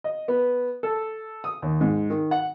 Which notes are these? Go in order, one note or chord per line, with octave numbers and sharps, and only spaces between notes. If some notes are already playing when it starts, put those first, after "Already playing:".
D#5
B3
A4
D#6
D#2
G#2
D#3
F#5